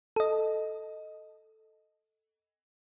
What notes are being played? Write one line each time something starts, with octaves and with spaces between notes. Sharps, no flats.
A4 D#5